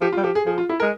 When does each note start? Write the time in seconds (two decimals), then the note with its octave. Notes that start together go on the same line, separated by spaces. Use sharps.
0.01 F3 G4
0.12 F4
0.17 G3
0.24 F3 G4
0.35 G#4
0.46 F3 G#4
0.58 F4
0.69 E4
0.80 G#3 A#4